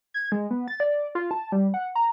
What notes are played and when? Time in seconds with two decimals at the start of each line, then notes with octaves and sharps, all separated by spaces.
0.14 G#6
0.32 G#3
0.51 B3
0.68 A6
0.80 D5
1.15 F4
1.31 A5
1.52 G3
1.74 F#5
1.96 A#5